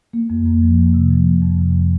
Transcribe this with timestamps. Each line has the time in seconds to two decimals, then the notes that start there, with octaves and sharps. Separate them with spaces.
0.13 A#3
0.30 F2
0.46 A#3
0.62 F3
0.78 F2
0.94 C3
1.10 F3
1.27 A#3
1.43 F2
1.59 C3